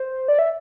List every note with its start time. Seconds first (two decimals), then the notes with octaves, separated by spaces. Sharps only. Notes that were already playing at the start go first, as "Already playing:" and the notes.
Already playing: C5
0.28 D5
0.39 E5